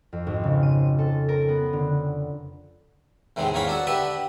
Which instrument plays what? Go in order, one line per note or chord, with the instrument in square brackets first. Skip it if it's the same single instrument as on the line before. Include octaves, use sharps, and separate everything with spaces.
[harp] F2
G#1
C#3
D#7
A4
A#4
B3
D3
[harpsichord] E2 A2 C3 D#3 G#3
E2 G#2 A#3 C#5 F5 B5
D4 F#4 A4
D3 G4 B4 E5